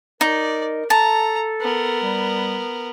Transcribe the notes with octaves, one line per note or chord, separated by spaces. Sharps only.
D#4 A#4 D5
A4 A5 A#5
B3 A#4
G3